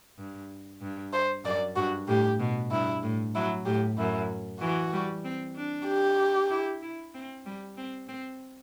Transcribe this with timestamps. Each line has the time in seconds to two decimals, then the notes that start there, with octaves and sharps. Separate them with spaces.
0.18 G2
0.81 G2
1.13 C5
1.45 F#2 D5
1.76 G2 F#4
2.08 A2 G4
2.39 B2
2.71 G2 E4
3.03 A2
3.35 F#3 E4
3.66 A2 G4
3.98 F#2 E4
4.61 E3 F#4
4.93 G3
5.24 C4
5.56 D4
5.87 G4
6.50 E4
6.82 E4
7.14 C4
7.46 G3
7.77 C4
8.08 C4